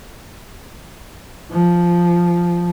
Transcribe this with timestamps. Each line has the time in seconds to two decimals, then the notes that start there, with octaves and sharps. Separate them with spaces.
1.50 F3